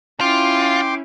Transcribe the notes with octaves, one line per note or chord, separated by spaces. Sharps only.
C#4 E4 F4 G5 C6 D6